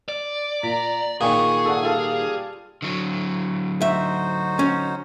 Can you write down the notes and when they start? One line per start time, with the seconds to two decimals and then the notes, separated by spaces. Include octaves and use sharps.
0.09 D5
0.63 A#2 A#5 B6
1.21 A#2 D#3 G#4 G#5 C#6 D#6
1.66 A4 D5 F#5
1.82 G3 F4 A4 F5
2.82 D3 F#3
3.82 D#4 F#4 C5 E5
4.59 C#4